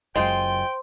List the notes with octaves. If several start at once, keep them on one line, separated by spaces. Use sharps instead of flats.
F#1 F#2 G#3 F4 C5 G5 C6